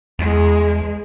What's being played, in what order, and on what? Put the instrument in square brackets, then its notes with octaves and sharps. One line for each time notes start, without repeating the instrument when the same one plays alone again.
[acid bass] E2 [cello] G#3